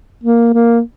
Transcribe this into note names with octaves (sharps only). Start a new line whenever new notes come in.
A#3
A#3